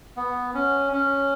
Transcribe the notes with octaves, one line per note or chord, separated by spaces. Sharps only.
B3
C#4
C#4